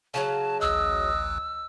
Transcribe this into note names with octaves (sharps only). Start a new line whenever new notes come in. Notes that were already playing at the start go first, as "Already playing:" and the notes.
C#3 F3 F#3 A5
A1 D2 D#5 E6 F#6